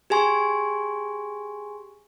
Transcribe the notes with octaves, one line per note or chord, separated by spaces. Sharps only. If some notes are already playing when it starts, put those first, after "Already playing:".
G4 G#4 G#5 C6 C#6